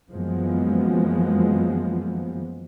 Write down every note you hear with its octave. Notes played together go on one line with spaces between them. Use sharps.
F#2 E3 F3 G#3 A#3 B3